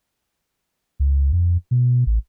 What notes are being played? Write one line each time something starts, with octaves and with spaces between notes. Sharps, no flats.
C#2
F2
B2
A1